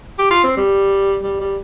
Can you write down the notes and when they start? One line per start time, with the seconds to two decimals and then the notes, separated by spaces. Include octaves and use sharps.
0.19 G4
0.31 F4
0.44 C4
0.57 G3
1.23 G3
1.40 G3